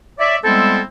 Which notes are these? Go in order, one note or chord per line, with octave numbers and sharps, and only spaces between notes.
C#5 D5 E5
G3 G#3 B3 C4 E4 A4